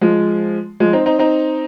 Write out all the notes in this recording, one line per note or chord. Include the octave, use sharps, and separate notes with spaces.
F3 G#3
F3 G#3
C4 D#4
C4 D#4
C4 D#4